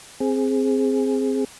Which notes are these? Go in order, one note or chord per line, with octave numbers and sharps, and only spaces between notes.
C4 G#4